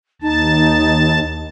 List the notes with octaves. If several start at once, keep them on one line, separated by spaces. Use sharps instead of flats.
D#2 D#4 A5